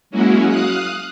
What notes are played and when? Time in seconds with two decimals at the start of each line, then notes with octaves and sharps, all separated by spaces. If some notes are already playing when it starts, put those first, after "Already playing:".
0.11 F#3 G#3 A#3 C#4 E4 F#4
0.46 F5 D#6 F#6